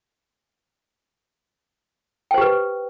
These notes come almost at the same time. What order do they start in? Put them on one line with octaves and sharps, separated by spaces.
G5 C5 G4 B4